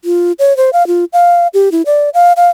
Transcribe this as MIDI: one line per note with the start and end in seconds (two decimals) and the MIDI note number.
0.05 0.32 65
0.39 0.56 73
0.57 0.70 72
0.73 0.86 77
0.87 1.05 65
1.13 1.47 77
1.54 1.71 67
1.72 1.82 64
1.86 2.10 74
2.14 2.33 77
2.37 2.50 77